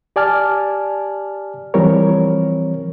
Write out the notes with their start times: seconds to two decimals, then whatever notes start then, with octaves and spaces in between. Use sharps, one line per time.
0.16 G4 D5 G#5 A5 F6
1.74 E3 F3 G3 C4 A#4 C#5